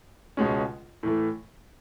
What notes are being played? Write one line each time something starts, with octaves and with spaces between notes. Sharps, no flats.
C#2 B2 G#3 C#4
A2 E3 A3